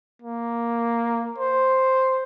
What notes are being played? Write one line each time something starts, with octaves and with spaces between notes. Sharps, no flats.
A#3
C5